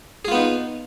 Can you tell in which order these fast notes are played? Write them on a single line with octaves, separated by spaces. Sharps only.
G#4 F4 B3 D#4